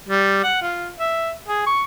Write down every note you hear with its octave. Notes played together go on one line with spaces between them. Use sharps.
G3
F#5
F4
E5
G#4
C#6